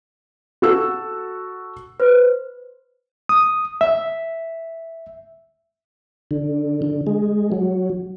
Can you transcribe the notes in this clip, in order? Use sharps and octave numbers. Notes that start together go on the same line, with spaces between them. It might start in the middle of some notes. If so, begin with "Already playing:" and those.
F#4 A4 E6
B4 C5
D#6
E5
D3
D3
G#3
F#3